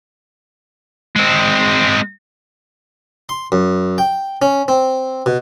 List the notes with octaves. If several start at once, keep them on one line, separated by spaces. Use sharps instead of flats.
G#3 C4
C6
F#2
G5
C#4
C4
B2